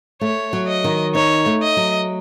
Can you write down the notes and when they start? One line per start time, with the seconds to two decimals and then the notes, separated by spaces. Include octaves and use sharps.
0.21 A3 C#5
0.53 F#3
0.68 D#5
0.84 D#3
1.15 D#4 C#5
1.46 A3
1.62 D#5
1.77 F#3